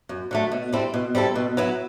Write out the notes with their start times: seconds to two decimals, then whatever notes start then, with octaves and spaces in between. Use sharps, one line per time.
0.09 F#2
0.31 D3 F#3 A3
0.52 B2
0.73 G3 C4 E4 A4
0.94 B2
1.15 G3 C4 E4 A4
1.35 B2
1.57 F#3 B3 E4